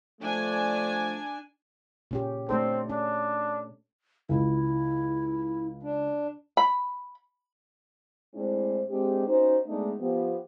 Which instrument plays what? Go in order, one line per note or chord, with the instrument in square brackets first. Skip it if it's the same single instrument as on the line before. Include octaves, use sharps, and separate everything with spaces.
[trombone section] F3 A3 [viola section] D4 G#5
[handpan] A#2 C#4 G4
[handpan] A3 D4 A4 [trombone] C4
[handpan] C#4 [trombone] D4
[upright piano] C#2 [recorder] E4
[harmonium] D4
[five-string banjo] B5
[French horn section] A2 G#3 C4 D4 E4 C5
G#3 C4 D4 G4
C#4 D#4 F#4 C5
G#3 A3 B3 D4 D#4
F3 B3 G4